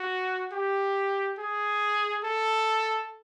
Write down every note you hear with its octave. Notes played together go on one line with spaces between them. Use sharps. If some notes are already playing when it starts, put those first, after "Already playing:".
Already playing: F#4
G4
G#4
A4